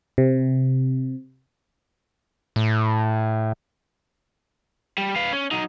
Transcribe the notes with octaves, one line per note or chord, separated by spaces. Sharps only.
C3
A2
G3
B4 F5
C#4
F#3 D#4